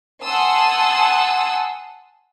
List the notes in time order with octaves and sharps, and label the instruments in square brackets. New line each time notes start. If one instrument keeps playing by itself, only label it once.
[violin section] F#5 G#5 A5 C6 D#6 E6